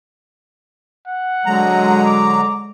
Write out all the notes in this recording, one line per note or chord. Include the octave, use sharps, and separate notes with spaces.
F#5
D3 F#3 G#3 A#5
D6